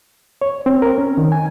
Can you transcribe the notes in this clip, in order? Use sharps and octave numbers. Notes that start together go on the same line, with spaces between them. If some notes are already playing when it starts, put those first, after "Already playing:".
C#5
C4
A#4
C#4
D#3
G#5